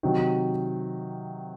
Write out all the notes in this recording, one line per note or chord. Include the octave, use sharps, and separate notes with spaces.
C3 D#3 F#3